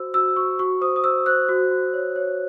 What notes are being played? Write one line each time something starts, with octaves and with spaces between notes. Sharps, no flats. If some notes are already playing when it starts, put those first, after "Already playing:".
Already playing: F#4 C5 E6
F#4 E6
F#4 C#6
F#4 C#6
C5 D#6
D#6
C5 E6
C5 F#6
F#4
F#4
C#5
C#5